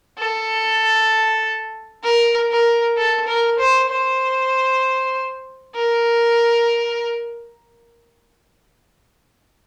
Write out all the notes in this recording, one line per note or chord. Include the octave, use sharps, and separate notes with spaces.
A4
A#4
A#4
A4
A#4
C5
C5
A#4